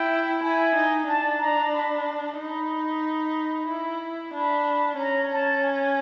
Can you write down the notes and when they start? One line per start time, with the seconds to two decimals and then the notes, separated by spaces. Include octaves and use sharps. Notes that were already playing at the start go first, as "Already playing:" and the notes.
Already playing: E4 G5
0.42 E4 G#5
0.75 D#4
1.07 D4 A5
1.39 A#5
1.73 B5
2.37 D#4 B5
3.68 E4
4.33 D4 B5
4.98 C#4 A#5
5.31 A5
5.64 G#5